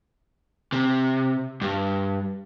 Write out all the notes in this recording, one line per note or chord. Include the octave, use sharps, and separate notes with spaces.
C3
G2